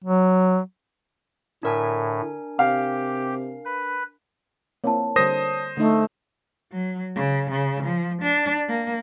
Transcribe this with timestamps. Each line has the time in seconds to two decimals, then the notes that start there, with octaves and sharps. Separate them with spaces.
0.04 F#3
1.63 A2 D3 D4 A#4 G#5
2.59 C3 G4 F5
3.65 B4
4.84 A#3 C4 E4 C#5 A5
5.16 D3 G3 A#4 C5 D#6 A#6
5.77 D3 A3 D#4
6.72 F#3
7.16 C#3
7.50 C#3
7.83 F3
8.22 D4
8.69 A#3